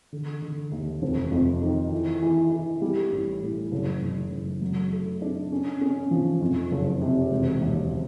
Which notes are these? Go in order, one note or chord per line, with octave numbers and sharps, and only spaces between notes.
D3
D3
D#2
F1
F2
D#3
E3
E3
E3
G3
A1
A2
F#1
F#1
F#1
F#3
A3
D4
C#4
C#4
F3
F2
F#1
C3
E1
D#2